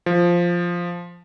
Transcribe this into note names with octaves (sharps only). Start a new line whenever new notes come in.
F3